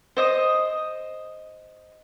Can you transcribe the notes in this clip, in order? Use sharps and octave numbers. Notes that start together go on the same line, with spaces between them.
C5 D#5 D#6